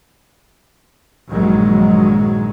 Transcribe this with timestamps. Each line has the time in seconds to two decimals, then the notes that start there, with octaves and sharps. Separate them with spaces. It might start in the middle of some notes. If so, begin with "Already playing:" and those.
1.29 A#1 G2 D#3 F#3 G#3